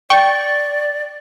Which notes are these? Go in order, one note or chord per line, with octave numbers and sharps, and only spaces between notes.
D5 G5 C#6